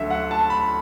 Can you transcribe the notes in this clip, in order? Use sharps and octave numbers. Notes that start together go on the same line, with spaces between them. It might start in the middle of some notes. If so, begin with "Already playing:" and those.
Already playing: D2 D3 F#3 E5
F#5
A5
B5